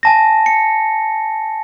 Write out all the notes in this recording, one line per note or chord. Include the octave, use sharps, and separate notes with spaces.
G#5 A5 A#6
C#7